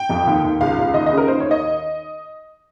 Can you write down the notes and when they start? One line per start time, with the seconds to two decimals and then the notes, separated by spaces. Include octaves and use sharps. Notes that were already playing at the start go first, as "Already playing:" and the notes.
Already playing: G5
0.09 F2
0.27 D#2
0.44 D#2
0.61 C#2 F5
0.77 C#2
0.94 D#2 D#5
1.06 D#5
1.12 C#3
1.17 A#4
1.28 D#2 C5
1.40 D#3 C#5
1.51 D#5